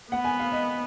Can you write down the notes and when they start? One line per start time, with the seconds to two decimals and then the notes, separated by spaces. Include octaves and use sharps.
0.11 B3 F#5
0.25 G#5
0.39 F5
0.52 D#5